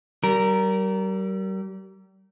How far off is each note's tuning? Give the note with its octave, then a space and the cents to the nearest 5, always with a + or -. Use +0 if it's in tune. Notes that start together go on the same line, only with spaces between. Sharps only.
G3 -35 A#4 +0